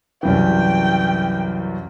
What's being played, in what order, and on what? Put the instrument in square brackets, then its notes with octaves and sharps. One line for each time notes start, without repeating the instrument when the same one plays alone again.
[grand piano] C2 F#2 E3 [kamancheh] G5